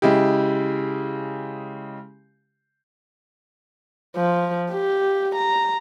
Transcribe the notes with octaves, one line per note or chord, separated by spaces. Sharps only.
C#3 G#3 E4 G4
F3
G4
A#5